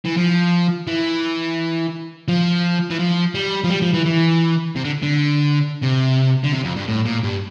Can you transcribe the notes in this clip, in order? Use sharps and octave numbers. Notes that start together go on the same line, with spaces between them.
E3
F3
E3
F3
E3
F3
G3
F3
G3
F3
E3
E3
C3
D3
D3
C3
D3
C3
F2
G2
A2
A#2
G2